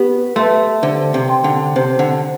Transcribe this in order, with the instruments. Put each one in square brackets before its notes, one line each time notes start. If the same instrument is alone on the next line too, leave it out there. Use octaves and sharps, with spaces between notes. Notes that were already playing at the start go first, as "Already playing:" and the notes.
Already playing: [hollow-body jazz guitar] B3 [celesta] G4
[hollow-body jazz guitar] A3 [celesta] B4 E5 A5 C6
[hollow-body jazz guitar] D3 [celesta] C5
[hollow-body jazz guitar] C3
[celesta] G5 C6
[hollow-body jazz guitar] D3
[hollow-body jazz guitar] C3 [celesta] C5
[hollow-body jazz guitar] D3